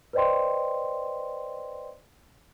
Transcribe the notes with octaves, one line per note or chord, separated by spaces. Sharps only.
B4 C5 D5 D#5 G5 C6